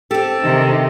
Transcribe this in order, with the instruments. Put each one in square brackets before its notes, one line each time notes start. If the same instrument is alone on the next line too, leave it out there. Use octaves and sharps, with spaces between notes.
[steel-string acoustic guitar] C4 G4 [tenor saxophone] A4
[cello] C3 D#3